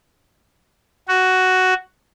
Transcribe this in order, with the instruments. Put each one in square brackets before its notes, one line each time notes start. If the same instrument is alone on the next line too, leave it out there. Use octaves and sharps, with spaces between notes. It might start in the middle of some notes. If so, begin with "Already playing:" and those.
[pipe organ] F#4